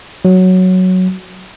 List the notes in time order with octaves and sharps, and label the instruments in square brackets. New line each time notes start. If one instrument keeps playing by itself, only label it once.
[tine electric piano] F#3